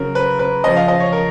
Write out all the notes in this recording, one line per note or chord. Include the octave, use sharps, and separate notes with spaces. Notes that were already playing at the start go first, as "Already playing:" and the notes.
Already playing: C#3 F#3 A#4
B4
B4
C#3 F3 D#5
F5
D#5
C#5
A#4